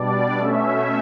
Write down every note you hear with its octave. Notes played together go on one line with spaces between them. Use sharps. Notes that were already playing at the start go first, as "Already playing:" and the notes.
Already playing: B2 G3 D4 D5
B2 A3 C#4 E5